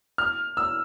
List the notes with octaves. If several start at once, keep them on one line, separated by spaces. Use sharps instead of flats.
F6
E6